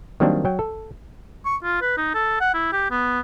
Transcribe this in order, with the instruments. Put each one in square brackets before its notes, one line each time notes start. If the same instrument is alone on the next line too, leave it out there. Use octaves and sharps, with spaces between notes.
[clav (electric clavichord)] D#3 F#3 G3 A#3 C4 D4
F#3 G5
A4
[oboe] C#6
F4
B4
D#4
A4
F#5
E4
G4
B3